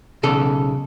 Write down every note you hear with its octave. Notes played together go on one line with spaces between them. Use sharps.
B1 C#3 A4